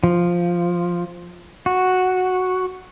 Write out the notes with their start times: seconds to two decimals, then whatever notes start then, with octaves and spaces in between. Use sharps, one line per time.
0.04 F3
1.66 F#4